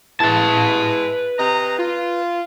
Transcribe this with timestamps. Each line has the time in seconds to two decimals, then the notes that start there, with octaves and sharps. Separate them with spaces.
0.20 G#3 B3 E4 B4 A5
1.38 C3 D#5 A#5
1.78 F4